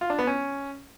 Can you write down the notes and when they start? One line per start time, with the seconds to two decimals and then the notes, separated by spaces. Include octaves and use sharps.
0.01 F4
0.10 D4
0.19 B3
0.27 C#4